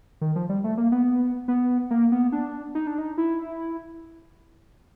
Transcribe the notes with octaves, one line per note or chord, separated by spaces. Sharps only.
D#3
F3
G3
A3
A#3
B3
B3
A#3
B3
D4
D#4
D4
D#4
E4